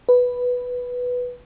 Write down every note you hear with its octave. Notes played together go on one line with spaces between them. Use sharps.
B4